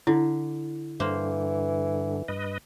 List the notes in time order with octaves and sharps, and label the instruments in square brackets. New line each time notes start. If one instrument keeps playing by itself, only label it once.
[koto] D3 [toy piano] E4
[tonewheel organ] G2 D3 [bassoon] E3 [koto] A#3 C5
[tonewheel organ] G2 B4 D#5